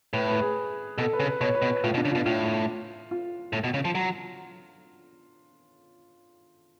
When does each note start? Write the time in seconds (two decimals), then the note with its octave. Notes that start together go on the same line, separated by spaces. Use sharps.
0.13 A2 B4
0.28 B4
0.41 G#4
0.98 B2 A4
1.13 B4
1.20 C#3
1.27 B4
1.41 B2 C#5
1.55 B4
1.62 B2
1.69 B4
1.84 A2 F4
1.94 B2
1.97 D4
2.05 C#3
2.12 B2 F4
2.26 A2 F4
3.11 F4
3.53 A2
3.64 B2
3.74 C#3
3.85 F3
3.95 F#3